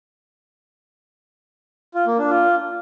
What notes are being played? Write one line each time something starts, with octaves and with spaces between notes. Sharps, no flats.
F4
A#3
D4
F4